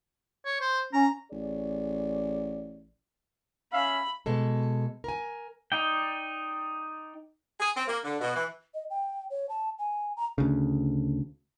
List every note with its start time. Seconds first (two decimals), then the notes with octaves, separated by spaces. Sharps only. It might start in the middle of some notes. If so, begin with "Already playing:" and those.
0.45 C#5
0.60 C5
0.93 C#4 A#5
1.32 A1 G#4 C#5 D5
3.73 C#4 E5 F5 B5
4.26 B2 G#3 A4
5.04 A#4 G#5
5.72 D#4 D5 G5
7.59 G#4
7.75 C4
7.87 A#3
8.04 D3
8.20 B2
8.35 E3
8.74 D#5
8.90 G5
9.30 C#5
9.49 A5
9.79 G#5
10.17 A#5
10.38 D2 C#3